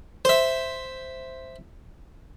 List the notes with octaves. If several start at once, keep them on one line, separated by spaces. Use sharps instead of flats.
C5 E5